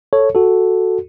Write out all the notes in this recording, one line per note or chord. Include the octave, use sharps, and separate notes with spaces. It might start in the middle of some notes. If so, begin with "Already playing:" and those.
A4 C#5
F#4 A4